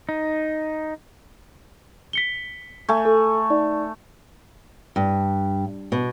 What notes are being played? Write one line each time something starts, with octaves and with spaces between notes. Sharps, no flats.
D#4
B6 C#7 G7
A3 G#5
A4
D#4 D5
G2
B2